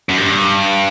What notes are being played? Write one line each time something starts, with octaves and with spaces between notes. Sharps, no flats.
F#2
G2